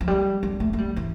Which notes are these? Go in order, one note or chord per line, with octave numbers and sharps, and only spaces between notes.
F3
G3
G3
A3
A3
G3
E3